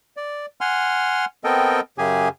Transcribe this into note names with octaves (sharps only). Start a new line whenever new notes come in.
D5
F#5 G#5 C6 F6
B3 C4 A4 A#4 D#5 G5
F#2 C#3 G4 G#4 G#5